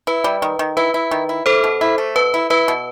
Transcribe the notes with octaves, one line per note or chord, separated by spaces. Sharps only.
E4 B4
G3
D#3
D#3
E4 B4
E4
D#3
E4
E4 A4 C5
B2
E4
A3
B2 B4
E4
E4 B4
B2